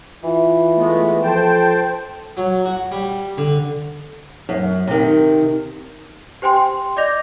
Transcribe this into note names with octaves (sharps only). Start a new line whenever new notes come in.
E3 F4
G#3 A3 B3
F3 A4 C5 G5 A5
F#3
F#4
G3
D3
F#2
C3 D#3
G4 C5 G5 G#5 C6
C6
D5 D#5 D6 G6 A#6 F7